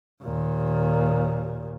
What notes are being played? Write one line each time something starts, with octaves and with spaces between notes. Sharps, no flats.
D#2 A#2